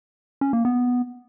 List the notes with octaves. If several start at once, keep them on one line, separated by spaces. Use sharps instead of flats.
C#4
A#3
B3